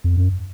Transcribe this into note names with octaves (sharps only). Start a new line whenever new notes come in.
F2
F#2